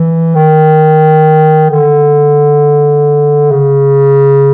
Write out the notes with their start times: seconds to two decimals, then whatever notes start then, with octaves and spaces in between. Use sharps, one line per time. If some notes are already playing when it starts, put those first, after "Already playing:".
Already playing: E3
0.35 D#3
1.70 D3
3.51 C#3